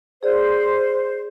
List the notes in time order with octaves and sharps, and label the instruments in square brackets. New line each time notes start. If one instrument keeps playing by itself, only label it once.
[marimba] G#4 D5 [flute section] C5